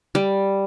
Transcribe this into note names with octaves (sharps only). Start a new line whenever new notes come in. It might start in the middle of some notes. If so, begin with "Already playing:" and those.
G3